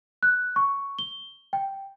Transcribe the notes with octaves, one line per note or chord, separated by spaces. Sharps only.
F#6
C#6
G7
G5